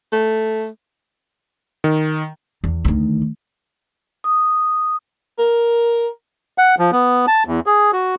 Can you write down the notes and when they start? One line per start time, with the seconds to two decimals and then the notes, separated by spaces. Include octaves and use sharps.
0.13 A3
1.84 D#3
2.64 E2
2.85 D2 D#3
4.24 D#6
5.39 A#4
6.58 F#5
6.79 F3
6.92 B3
7.28 A5
7.47 E2
7.66 G#4
7.93 F#4